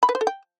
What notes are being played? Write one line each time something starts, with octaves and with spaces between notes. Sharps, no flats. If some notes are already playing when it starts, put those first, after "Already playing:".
B5
B4
C5
A4
G5